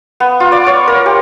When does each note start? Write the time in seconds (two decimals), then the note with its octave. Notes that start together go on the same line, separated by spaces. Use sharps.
0.20 B3
0.40 F4
0.52 D5
0.67 C#5
0.87 A#4
1.06 G4